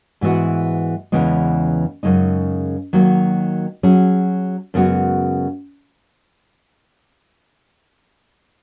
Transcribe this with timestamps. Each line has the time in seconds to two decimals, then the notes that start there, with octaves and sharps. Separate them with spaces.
0.21 G#2 E3 G#3 B3 F#4
1.12 E2 C#3 E3 G#3 B3
2.03 F#2 C#3 G#3 D#4
2.93 D#3 F#3 A#3
3.83 F#3 C#4 G#4
4.74 F#2 C#3 G#3 B3 F#4